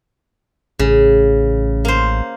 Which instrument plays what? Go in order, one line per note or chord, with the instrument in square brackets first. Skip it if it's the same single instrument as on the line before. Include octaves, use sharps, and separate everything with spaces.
[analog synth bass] A1 [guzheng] C#3
[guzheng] A#3 C5